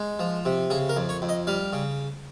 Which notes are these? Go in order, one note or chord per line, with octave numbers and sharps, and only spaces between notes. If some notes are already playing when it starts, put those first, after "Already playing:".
Already playing: G#3
F3
C3
C#3 G#4
A#4
F2
C#5
F2
D#5
G3 F5
C#3